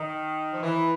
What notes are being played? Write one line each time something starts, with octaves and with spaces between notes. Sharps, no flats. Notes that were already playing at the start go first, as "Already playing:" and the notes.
Already playing: D#3
F3
E3